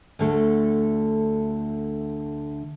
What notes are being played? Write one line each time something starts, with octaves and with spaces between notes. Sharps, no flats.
D2 D3 A3